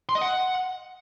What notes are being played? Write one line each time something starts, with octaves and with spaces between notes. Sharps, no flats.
C6
D#5
F#5